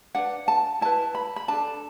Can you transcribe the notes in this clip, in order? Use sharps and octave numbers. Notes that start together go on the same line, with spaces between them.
D4 B4 F#5
A5
E4 B4 A5
B5
B5
D4 A4 A5